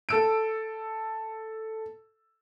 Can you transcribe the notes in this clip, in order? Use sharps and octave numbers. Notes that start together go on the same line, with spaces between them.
A4 E6 D7